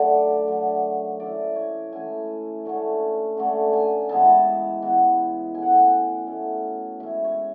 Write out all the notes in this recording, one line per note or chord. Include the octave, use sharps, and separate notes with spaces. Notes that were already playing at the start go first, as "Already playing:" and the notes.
Already playing: F#2 D3 F#3 A3 D5
F#2 D3 F#3 A3
E3 A3 C#4 E4 D5
C#5
E3 A3 C#4 E4 G#5
D3 A3 C#4
D3 A3 C#4
G#5
E3 G#3 B3 E4 A5
E3 G#3 B3 E4
B2 A3 C#4 G#5
F#5
G#5
B2 A3 C#4
E3 G#3 C#4 E4 E5
C#5